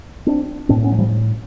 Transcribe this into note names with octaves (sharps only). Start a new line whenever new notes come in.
C4 D4
A2 C4 D4
B3 C#4
F#3
F3 G3